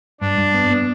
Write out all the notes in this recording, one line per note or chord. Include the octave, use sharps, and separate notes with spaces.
G2 D4
G2
B3
B3